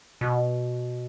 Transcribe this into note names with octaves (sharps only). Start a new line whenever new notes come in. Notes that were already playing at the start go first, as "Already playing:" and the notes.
B2